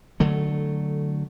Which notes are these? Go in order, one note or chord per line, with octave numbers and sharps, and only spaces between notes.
D3 F#3 A3